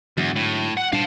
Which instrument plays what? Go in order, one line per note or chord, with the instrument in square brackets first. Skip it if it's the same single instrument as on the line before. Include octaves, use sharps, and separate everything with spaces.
[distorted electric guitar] E2 [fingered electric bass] G#2 D3 F#3
[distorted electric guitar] A2
F#5
[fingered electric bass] A#2 G3 D4 [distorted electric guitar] F5 A5